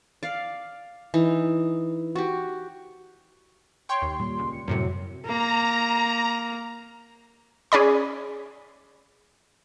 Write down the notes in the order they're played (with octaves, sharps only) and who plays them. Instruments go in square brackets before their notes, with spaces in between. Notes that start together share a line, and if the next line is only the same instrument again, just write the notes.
[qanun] D5 F5
E3 D#4
F#4 G4
[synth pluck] C#5 G5 C#6 [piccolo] C6
[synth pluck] D#2
[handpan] A#2 G3 [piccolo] C6
[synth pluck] C#2
[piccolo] C#7
[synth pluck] F#2 A2 C3 [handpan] F#3
[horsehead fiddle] A#3 [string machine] A#5
[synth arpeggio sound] C#4 G#4 D5 B5